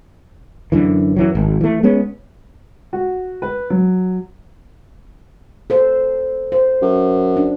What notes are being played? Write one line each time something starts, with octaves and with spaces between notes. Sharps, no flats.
F#2 D3 E3
F#2 E3 F#3
G#1
E3 A3
G#3 B3 C#4
F#4
B4
F#3
A4 C5
C5
F#2
D4